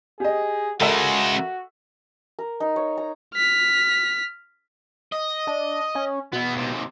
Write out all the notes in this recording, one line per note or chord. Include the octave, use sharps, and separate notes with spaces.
G4 G#4 D#5
C#3 G#3 F#4 A4 A#4 E5
A#4
D#4
C#5
A#5
F6 B6
D#5
D4
C#4
B2 B3 E4
D#2 C3